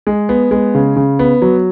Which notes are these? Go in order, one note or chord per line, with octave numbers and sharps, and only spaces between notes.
G#3
B3
G#3
C#3
C#3
B3
F#3